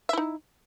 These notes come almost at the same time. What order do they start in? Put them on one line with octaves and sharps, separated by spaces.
E5 E4 D#4